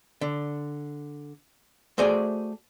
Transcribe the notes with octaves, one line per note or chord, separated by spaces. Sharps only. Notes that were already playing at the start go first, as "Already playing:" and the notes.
D3
A3 F#4 G#4 C5 D5 G#5